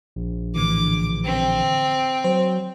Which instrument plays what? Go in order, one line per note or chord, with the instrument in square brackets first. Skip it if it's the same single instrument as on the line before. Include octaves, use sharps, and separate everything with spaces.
[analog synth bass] A#1
[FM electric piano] A2 D3 E3 [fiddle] D6
[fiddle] C4
[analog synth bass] F#3 [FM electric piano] C5